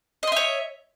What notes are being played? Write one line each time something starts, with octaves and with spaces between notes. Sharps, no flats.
C#5 D#5 E5 C6